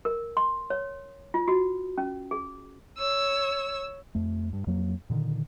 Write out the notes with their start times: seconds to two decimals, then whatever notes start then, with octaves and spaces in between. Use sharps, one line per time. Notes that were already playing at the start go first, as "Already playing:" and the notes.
0.05 A#4
0.37 C6
0.70 C#5
1.34 F4
1.48 F#4
1.98 C#4
2.31 G#4
2.98 C#5 E6
4.15 F2 A3
4.53 G2
4.67 F2 F#3 A#3
5.10 A#2 D3 D#3